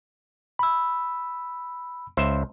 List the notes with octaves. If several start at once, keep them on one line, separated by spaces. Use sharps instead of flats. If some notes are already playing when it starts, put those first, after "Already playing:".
B5 E6
C#2 C5 E5